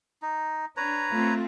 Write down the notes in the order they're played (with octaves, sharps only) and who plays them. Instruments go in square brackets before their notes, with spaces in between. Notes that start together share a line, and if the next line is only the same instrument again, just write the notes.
[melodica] D#4
[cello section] D4 [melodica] B4 C#5 A#5
[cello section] A3 C4 F4